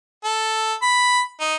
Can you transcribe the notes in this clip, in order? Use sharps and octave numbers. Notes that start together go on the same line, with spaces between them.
A4
B5
D#4